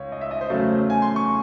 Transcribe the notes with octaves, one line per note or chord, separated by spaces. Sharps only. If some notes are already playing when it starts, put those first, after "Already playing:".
Already playing: C#2 C#5
D#5
E5
D#5
C5
E2 C#3 F#3 A3
G#5
C6
C#6